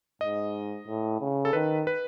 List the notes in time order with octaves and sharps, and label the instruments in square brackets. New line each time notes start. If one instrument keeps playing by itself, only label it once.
[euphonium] G#2 [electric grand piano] D#5
[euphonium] A2
C#3
[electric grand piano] A4
[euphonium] D#3 [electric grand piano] B4
[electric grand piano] B4